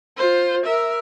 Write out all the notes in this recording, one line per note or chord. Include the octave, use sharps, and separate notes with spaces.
F4 C5
A#4 E5